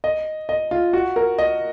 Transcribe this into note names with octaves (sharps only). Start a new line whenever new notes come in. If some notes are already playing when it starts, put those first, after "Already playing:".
D#5
D#5
F4
F#4
A#4
D#5